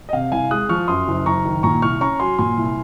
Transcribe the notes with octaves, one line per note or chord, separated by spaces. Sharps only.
D#5
C3 F5
C2 F5 G#5
G#3 D#6 F#6
F3 C#6 F6
F#2 C6 D#6
F#1
F#1 A#5 C#6
D#3
A#2 A#5 C#6
C2 C#6 F6
C#4 A#5 C#6
F#3 G#5 C6
A#2 G#5 C6
C2